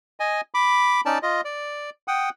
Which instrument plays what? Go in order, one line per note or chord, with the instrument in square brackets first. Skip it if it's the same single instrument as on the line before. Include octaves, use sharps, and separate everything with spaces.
[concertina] D#5 G#5
B5 D6
C#4 D#4 D5 A5
F4 D#5
D5
F#5 G5 D#6